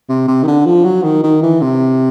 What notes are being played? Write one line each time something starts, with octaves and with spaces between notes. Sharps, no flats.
C3
C3
D#3
D3
F3
F#3
D#3
D#3
E3
C3